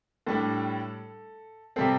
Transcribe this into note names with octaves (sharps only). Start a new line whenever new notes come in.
A2 G3 D4 A4
C3 G3 C4 A4